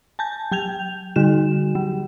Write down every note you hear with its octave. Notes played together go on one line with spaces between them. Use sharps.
G#5 A5 G6
F#3 G5 G6 F7
D3 G3 F#4 E7
F#3